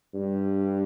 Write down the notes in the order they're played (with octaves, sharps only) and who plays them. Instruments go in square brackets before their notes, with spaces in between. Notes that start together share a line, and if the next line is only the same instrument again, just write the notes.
[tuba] G2